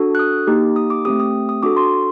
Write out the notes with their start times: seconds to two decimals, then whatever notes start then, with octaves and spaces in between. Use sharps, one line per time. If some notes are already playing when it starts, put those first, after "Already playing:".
Already playing: D4 F#4 A4
0.15 F#6
0.19 D#6
0.47 A#3 D#4 G4
0.76 D#6
0.90 D6
1.05 A3 C4 G4 D#6
1.20 D#6
1.49 D#6
1.63 D4 F#4 A4 D6
1.77 C6